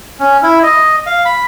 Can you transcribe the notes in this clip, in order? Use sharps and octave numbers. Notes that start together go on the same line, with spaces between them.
C#4
E4
D#5
F5
B5